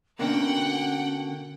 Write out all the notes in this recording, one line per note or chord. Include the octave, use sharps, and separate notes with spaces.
B2 D3 A#3 C#4 F#5 G5